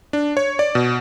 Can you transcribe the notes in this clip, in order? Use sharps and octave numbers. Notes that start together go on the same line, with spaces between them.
D4
C#5
D5
B2